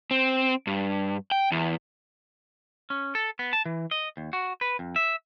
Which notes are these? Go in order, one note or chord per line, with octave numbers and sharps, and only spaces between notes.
C4
G2
G5
E2
C#4
A4
B3
A5
E3
D#5
D#2
F#4
B4
F2
E5